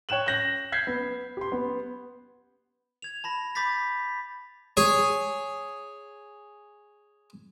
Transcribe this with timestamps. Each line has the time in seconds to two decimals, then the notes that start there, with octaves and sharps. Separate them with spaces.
0.09 C#5 G5 F#6 E7 F#7
0.26 G6 A#6 F#7
0.72 G6 G#6 B6 C7
0.87 B3
1.37 G4 C6
1.52 B3
3.02 G#6 F7
3.24 A5 B5 A#6
3.55 B5 D6 G6 A6 B6
4.77 G#4 C#5